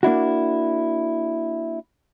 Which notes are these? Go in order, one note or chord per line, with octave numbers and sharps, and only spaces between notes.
A#3 D4 E4 F#4